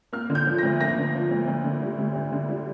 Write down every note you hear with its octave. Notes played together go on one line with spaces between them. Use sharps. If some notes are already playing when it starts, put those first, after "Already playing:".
A#3 F6
D3
G6
F3
D2 A#6
A#3 A#6
D3
F3
D2
D2
D3
G3
D2
D2
D3
G3